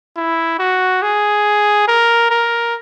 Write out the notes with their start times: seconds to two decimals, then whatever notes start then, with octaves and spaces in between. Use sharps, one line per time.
0.17 E4
0.59 F#4
1.02 G#4
1.88 A#4
2.31 A#4